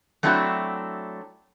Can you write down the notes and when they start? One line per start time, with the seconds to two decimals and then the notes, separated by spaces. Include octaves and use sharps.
0.23 F#3 A3 C4 D4 E4 F#4